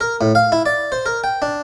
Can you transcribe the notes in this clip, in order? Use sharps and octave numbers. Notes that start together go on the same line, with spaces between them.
A#4
A2
F5
E4
D5
C5
A#4
G5
D4